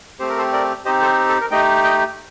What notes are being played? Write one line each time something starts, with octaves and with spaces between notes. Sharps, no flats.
A3 C4 G4 C5
A#4
A4 C5
A#4 D5
C4 D#4 G4 C5 D#5
A4 C5
A4
A#4
A3 D#4 G4 D#5 G5
D#5 G5